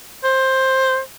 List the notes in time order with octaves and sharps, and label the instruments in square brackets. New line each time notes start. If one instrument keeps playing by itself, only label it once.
[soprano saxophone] C5